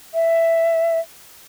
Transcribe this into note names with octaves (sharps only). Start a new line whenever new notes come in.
E5